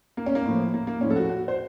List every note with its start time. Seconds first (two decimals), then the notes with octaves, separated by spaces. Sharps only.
0.17 A#3
0.26 C#4
0.35 A#3
0.45 A2 F3
0.74 A#3
0.87 A#3
1.01 A2 F3 C#4
1.10 A4
1.16 F#4
1.29 F#4
1.48 C5